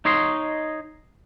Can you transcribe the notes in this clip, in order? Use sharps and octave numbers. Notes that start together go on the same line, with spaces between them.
D#4 C#5 D#5 C6